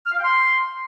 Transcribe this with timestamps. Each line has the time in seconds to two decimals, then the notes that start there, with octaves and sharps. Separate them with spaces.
0.06 F6
0.12 F5
0.18 G5
0.24 C6